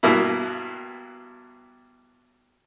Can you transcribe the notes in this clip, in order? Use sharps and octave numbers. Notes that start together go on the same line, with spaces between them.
G2 B2 A#3 E4